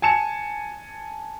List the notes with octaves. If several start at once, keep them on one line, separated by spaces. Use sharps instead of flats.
G#5 A5 C#7 E7